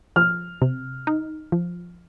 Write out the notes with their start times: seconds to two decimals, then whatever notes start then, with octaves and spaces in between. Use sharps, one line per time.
0.16 F3 F6
0.62 C3
1.07 D#4
1.52 F3